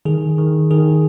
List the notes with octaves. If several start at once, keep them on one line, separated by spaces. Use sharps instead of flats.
D#3 G#4
D#3
D#3 G#4